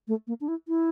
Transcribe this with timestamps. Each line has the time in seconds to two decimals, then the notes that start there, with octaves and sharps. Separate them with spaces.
0.08 A3
0.27 A#3
0.41 D4
0.48 E4
0.68 E4